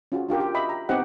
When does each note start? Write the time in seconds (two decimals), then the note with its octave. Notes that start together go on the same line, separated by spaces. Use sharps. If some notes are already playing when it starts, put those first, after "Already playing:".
0.12 C#4 F4 F#4 G#4
0.29 D4 F4 G4 A#4
0.40 G4
0.54 D#5 E5 B5
0.69 A#5
0.89 B3 C4 D#4 G4 D#5 F#5